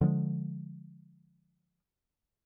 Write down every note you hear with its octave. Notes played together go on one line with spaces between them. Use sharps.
D3 F3 G3 G#3